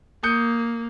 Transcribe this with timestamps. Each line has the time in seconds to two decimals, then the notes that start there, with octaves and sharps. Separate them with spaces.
0.23 A#3 D#6 G6 C#7